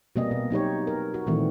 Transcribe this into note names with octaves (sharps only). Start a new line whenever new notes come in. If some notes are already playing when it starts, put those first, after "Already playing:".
B2 G3 A#3 C4 D#5
B2
F#3 D#4 G4 C#5
A#4
F#4
A#2 D#3 E3 G3 A3 C4